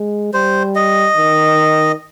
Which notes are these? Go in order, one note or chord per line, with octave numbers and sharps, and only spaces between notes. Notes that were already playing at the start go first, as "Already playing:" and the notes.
Already playing: G#3
G3 C5
D#5
D#3